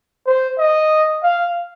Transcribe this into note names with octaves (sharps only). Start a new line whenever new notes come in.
C5
D#5
F5